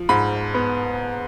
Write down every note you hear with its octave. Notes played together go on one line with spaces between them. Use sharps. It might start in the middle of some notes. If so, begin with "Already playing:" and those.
Already playing: F3
G#2 B5
B3